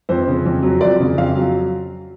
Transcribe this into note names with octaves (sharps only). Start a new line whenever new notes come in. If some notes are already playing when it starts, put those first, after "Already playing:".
F2 C5
C#3
F2
F#3
F2 D5
C#3
F2 F5
F#3